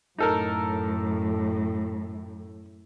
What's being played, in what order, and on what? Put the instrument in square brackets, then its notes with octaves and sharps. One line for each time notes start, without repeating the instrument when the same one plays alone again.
[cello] F#2 A2 [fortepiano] D#4 A4 A#4